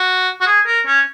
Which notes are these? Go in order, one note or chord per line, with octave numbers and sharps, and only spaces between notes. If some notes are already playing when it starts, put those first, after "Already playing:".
Already playing: F#4
F#4
G#4
A#4
C#4